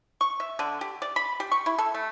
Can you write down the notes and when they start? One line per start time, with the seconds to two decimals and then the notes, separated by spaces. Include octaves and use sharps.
0.21 C#6
0.40 E5
0.59 D3
0.81 G4
1.02 D5
1.16 B5
1.40 G4
1.52 C#6
1.66 E4
1.78 A4
1.94 A3